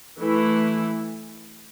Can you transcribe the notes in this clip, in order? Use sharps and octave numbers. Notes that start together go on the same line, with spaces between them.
E3 A3 E4